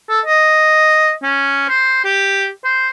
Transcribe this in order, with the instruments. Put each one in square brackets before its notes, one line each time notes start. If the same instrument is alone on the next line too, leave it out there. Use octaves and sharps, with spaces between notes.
[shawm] A4
D#5
C#4
C5
G4
C5